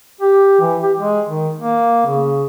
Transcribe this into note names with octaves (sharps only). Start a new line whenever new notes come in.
G4
E3
G4
G#3
D#3
A#3
C#3